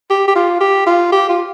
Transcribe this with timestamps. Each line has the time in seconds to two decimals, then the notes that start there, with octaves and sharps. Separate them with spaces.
0.10 G4
0.28 G4
0.35 F4
0.61 G4
0.87 F4
1.12 G4
1.29 F4